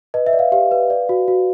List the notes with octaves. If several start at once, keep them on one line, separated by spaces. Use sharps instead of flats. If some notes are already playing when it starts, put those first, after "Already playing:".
B4 D#5
E5
D5
F5
G4 F5
B4
D5
F#4
F#4